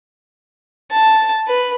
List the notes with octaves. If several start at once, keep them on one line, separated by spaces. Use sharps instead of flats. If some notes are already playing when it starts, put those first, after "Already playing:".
A5
B4